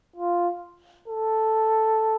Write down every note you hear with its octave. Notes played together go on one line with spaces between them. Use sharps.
F4
A4